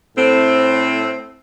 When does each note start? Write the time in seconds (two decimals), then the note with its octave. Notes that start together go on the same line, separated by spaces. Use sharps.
0.17 A2 C4